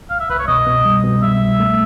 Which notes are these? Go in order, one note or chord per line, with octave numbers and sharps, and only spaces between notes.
C2 F5
E5
C2 B4
C#5
B2 D#5
B2
G3
B2
G3 E5
C2
A3